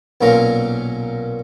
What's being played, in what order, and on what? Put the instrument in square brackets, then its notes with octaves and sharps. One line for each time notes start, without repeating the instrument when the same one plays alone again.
[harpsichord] B1 A#2 A#3 C#4 F4 A#5